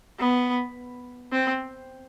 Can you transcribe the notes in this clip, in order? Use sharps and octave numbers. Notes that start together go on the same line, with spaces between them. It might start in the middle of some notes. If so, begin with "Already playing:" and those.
B3
C4